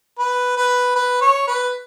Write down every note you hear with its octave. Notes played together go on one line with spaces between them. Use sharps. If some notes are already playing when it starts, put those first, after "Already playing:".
B4
B4
B4
C#5
B4